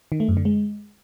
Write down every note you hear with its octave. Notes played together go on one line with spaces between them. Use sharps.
D#3
A3
F#2
D3
G#3